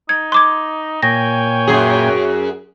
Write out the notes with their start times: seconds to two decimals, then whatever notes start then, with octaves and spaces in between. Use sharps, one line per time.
0.09 D#4 G#6
0.32 C6 D6 G#6
1.03 A#2 C#5 G5 G#5 A#6
1.67 F#2 G#4